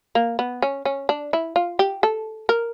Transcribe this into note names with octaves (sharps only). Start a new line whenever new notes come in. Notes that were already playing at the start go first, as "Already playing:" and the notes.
A#3
B3
C#4
C#4
D4
E4
F4
G4
A4
A#4